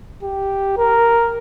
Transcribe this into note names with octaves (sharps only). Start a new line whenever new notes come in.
G4
A#4